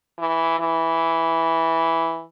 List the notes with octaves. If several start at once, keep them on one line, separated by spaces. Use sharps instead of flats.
E3
E3